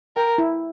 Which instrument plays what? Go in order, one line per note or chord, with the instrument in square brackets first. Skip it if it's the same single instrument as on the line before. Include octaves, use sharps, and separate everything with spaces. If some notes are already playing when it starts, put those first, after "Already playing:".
[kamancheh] A#4 [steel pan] G5
[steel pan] E4